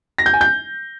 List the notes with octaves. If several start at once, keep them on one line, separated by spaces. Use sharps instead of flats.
A#6
G6
G#5
G6